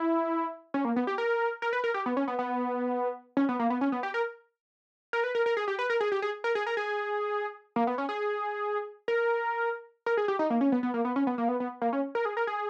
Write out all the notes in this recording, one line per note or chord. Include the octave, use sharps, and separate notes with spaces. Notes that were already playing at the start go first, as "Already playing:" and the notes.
Already playing: E4
C#4
A#3
B3
G4
A#4
A#4
B4
A#4
G4
B3
C#4
B3
B3
C#4
B3
A#3
B3
C#4
B3
G4
A#4
A#4
B4
A#4
A#4
G#4
G4
B4
A#4
G#4
G4
G#4
A#4
G#4
A#4
G#4
A#3
B3
C#4
G#4
A#4
A#4
G#4
G4
D#4
A#3
C#4
B3
B3
A#3
B3
C#4
B3
A#3
B3
B3
A#3
C#4
A#4
G#4
A#4
G#4